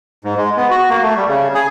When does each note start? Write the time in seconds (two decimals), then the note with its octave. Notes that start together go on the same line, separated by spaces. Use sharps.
0.24 G#2
0.37 G#3
0.57 B3
0.70 F#4
0.90 A#3
1.03 A3
1.16 G3
1.29 C#3
1.55 G#4